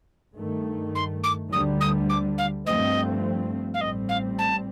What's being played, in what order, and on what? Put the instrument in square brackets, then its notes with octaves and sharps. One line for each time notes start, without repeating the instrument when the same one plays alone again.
[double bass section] G2 D#3 A3
[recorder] C6
D6
[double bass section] D2 D3 G3 [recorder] D#6
[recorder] D#6
D6
F5
[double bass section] G2 F3 A3 C4 [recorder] D#5
[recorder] F5
[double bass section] A1 A2 G3 C4 [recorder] D#5
[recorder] F5
A5